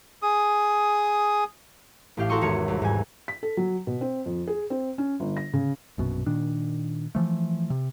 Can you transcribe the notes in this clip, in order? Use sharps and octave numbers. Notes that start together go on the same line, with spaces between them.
G#4 D#6
A1 A2 G4 F5
F#4 A4 A#5 C6 C#6 D#6
G#1 E2 F#4 A#4 C#5 C#7
C2
G#2 G3 G#5
B6
A4
F#3
B2
C4
F2
G#4
C4
C#4
G1
A#6
C#3
A#1 F#2 B2
A#2 D#3 D4
E3 F3 A3
C3